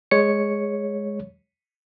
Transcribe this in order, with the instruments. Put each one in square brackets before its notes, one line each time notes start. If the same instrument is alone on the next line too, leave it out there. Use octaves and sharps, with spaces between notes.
[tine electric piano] G#3 C#5 C#7